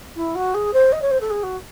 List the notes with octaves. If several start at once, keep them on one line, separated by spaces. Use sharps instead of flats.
E4
F#4
G#4
C5
D#5
C#5
C5
A4
G#4
F#4